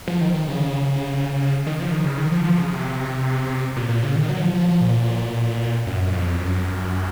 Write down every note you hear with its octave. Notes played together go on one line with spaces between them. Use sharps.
F3
D#3
D#3
C#3
D#3
F3
D#3
C#3
D#3
F3
F3
C#3
C3
A#2
A#2
C#3
D#3
F#3
F3
F3
F3
A#2
F#2
F2
F#2